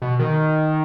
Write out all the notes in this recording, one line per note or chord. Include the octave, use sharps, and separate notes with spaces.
B2
D#3